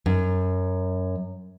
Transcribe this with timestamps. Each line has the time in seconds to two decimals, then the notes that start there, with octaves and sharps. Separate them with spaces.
0.06 F#2